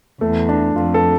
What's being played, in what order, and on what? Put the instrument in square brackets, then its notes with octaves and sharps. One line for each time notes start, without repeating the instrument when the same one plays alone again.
[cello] E2 [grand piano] A3
[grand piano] D4
[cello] F2 [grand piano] F4
[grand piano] A4